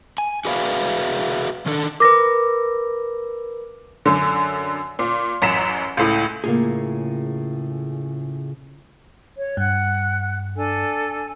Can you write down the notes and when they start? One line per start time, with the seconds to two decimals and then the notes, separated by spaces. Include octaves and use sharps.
0.18 G#5
0.45 F#4 G#4 B4 D5 E5 F5
1.66 D#3 D4 A4
2.00 A#4 B4 D6 A#6
4.06 F#2 D3
4.99 A#2
5.42 A1 F#2 A#5 B6 E7
5.97 C#2 A2
6.44 A2 C#3 A#3 F4 G#4
9.37 C#5
9.57 G2 F#5 F#6
10.56 D4 A4 G#5